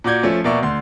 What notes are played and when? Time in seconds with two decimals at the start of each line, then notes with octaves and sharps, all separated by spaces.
0.04 A#2 F#4 D5 G6 G#6
0.23 F3 A3 C#4
0.44 B2 A#3 D5 E5 C#6
0.63 D2 C6